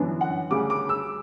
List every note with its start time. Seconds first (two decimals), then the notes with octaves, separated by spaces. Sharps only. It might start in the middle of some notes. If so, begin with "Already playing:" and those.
Already playing: G1 F#2 E3 B3 D4
0.21 F#5
0.51 D2 C#3 G3 D6
0.70 D6
0.89 E6